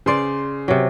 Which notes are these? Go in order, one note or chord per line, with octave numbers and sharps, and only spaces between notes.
C#3 C5 D5 C6
C3 F#3